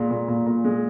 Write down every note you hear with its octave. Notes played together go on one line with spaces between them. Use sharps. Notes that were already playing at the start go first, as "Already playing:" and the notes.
Already playing: A#2 G#3
A#2
A#2
A#2
G#3